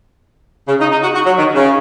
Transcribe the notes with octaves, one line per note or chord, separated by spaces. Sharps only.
C#3
D#4
D#4
F#4
F#4
F#3
D#3
C#3